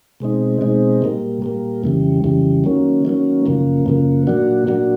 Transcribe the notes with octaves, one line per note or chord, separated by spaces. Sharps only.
B2 G#3 C4 D#4
B2 G#3 C4 D#4
A#2 G3 A#3
A#2 G3 A#3
F2 C#3 E3 G3
F2 C#3 E3 G3
D#3 F#3 A#3 C#4
D#3 F#3 A#3 C#4
F#2 C#3 F3 A#3
F#2 C#3 F3 A#3
A#2 F#3 A#3 D4 F#4
A#2 F#3 A#3 D4 F#4